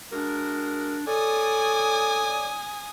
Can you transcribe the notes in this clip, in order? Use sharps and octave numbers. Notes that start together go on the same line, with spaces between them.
G#3 D4 F#4 A#4
A4 C#5 D5 G#5 D#6